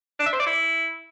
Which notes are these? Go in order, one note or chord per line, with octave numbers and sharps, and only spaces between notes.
D4
E5
C5
D5
E4